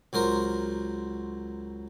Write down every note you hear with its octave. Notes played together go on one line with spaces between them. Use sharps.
C#2 F#3 A#4 C5